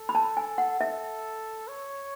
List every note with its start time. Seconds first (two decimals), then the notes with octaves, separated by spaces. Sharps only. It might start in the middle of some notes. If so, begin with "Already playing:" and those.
Already playing: A4
0.09 B5
0.15 A5
0.37 G#5
0.58 F#5
0.80 A4 E5
1.68 C#5